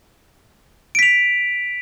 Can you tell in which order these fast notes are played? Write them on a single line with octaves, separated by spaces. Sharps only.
D7 B6 F7